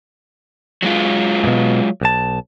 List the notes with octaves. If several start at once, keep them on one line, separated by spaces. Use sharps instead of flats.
F#3 G#3 F4
G#2 B2
B1 A5